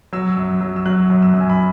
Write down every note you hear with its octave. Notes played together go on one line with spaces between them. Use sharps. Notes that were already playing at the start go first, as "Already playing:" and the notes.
F#3 E6
F#2
F#3
E6
F#3 F#6
F#2
E6
F#2
G#5
B5